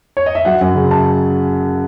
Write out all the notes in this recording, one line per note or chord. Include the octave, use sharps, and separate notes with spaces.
C#5
D#5
E5
F#3 F#5
F#2
C#3
A5